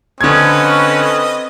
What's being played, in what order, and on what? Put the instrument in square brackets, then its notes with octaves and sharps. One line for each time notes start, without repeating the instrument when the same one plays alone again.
[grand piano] D3 G#6 [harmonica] C4 D#5 D#6 [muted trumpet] C#4 [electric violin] A4 B4